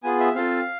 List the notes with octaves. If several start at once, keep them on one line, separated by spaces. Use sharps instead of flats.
B3 F4 G#4 G#5
E5
C4 F4 A4 F5